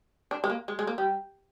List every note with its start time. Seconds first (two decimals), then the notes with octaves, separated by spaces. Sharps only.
0.31 D4
0.44 G#3
0.50 A#3
0.68 G#3
0.79 G#3
0.87 A#3
0.98 G3